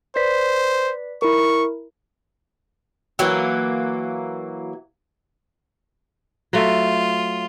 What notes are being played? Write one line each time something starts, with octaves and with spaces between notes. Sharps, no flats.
B4 C5 D5 B6
E4 A#4 C#6
E3 F#3 A#3
F#3 A3 F4 E5